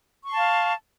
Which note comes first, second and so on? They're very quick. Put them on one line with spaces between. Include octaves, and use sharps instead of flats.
C#6 C6 A5 F5